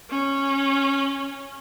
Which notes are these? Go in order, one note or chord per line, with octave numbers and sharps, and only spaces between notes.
C#4